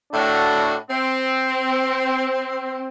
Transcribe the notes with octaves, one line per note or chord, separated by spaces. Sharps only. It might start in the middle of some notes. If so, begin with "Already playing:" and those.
A2 D4 F#4
C4